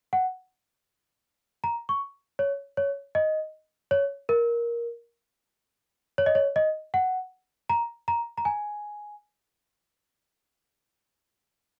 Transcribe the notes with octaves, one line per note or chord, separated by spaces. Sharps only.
F#5
A#5
C#6
C#5
C#5
D#5
C#5
A#4
C#5
D#5
C#5
D#5
F#5
A#5
A#5
A#5
G#5